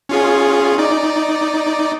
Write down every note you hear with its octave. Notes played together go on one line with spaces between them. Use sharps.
C#4 F4 G#4
D#4 D5